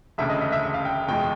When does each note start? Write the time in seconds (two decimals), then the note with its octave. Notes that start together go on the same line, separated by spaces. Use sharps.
0.18 E1 D2 C#3 E5
0.30 D#5
0.41 E5
0.52 E5
0.63 E5
0.74 F5
0.85 G5
1.08 E2 B2 G#3 G5